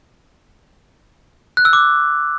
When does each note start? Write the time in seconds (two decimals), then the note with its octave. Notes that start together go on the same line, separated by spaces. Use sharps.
1.57 F#6
1.65 E6
1.73 D6